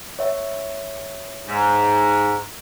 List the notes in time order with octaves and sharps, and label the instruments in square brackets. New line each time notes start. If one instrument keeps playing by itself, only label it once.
[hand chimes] C#5 E5
[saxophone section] G#2